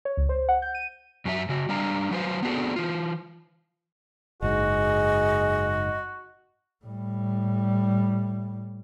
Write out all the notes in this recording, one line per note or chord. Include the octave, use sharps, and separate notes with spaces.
C#5
C#2
C5
F#5
G6
D#7
F#2 F#3 G4 E5
C#3 F#4
G3 D4 F5 A#5
F#3 B4 C5 F5
B3 C4 D4 F#4 G#4 A4
E3 F4
F#1 G#2 F#4 G#4 D#5
A2 G3